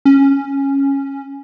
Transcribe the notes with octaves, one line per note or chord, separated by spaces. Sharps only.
C#4